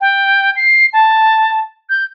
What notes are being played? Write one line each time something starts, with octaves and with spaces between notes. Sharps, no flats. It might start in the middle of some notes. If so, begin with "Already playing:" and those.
G5
C7
A5
G6